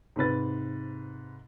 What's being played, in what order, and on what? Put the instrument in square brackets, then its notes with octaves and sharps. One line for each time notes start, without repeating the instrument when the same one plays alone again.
[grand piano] G#2 C3 B4 A6